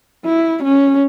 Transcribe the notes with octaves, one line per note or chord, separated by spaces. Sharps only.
E4
C#4